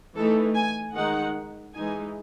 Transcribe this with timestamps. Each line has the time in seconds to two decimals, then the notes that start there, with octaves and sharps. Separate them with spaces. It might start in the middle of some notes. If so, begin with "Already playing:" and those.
0.15 E3 A3 D#4 A4
0.55 G#5
0.94 D#3 G#3 D#4 F#5
1.74 E3 G#3 D#4 G#5